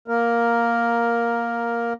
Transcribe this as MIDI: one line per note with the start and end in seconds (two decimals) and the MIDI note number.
0.08 1.93 58
0.08 1.93 70